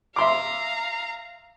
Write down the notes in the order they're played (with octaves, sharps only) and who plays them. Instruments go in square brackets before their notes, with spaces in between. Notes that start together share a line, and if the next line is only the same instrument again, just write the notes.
[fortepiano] E5 C6 D6 [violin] F5 A#5